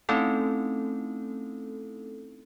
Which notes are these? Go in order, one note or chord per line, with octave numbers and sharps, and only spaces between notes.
A3 C4 C#4 D#4 E4 A4